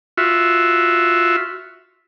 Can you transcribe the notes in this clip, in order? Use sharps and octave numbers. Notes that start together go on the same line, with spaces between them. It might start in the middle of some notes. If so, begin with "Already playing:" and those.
F4 F#4 E5